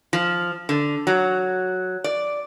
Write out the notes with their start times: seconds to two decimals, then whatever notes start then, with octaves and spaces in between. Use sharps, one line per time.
0.13 F3
0.69 D3
1.07 F#3
2.04 D5